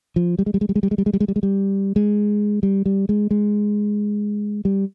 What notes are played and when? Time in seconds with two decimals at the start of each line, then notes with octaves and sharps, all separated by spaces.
0.16 F3
0.39 G3
0.46 G#3
0.54 G3
0.61 G#3
0.69 G3
0.75 G#3
0.83 G3
0.91 G#3
0.98 G3
1.06 G#3
1.13 G3
1.20 G#3
1.28 G3
1.36 G#3
1.43 G3
1.96 G#3
2.63 G3
2.86 G3
3.09 G#3
3.31 G#3
4.65 G3